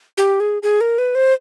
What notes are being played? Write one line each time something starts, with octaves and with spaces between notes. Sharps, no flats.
G4
G#4
G#4
A#4
B4
C5